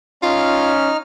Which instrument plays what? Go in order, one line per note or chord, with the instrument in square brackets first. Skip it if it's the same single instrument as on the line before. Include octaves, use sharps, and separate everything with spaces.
[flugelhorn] C#4 [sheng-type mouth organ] D#4 F6 [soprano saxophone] F4